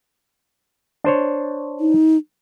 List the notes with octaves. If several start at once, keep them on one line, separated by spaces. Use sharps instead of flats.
D4 C5 C#5
D#4